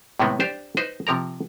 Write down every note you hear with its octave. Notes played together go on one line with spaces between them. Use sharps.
A2 C3 D#3 G#3 B3 C4
D4 G4 C5
D#4 B4 C5
C3 F3 A#4 A#5